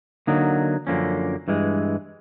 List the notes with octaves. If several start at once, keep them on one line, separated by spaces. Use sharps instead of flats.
D3 F#3 A#3 D#4
F#2 D3 F3 A#3 C#4
G2 E3 G#3